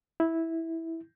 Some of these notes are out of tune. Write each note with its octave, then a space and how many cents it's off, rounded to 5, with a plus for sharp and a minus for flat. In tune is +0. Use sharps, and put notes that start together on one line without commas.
E4 -10